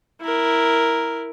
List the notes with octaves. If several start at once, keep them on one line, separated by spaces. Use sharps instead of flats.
E4 A#4